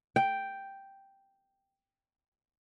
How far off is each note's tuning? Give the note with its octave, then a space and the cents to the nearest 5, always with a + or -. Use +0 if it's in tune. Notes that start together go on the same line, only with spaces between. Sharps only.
G5 +0